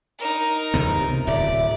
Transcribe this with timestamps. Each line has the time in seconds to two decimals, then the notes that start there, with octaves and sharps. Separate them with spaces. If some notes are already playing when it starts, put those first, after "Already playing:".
0.18 D#4 A#4
0.74 C#2 C3 B3
1.27 D1 D5 E5